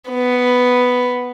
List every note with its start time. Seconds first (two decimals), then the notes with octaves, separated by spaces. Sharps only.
0.11 B3